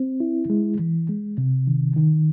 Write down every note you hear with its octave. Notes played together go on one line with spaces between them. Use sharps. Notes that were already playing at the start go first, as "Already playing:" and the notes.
Already playing: C4
E4
G#3
E3
G#3
C3
D#3
D#3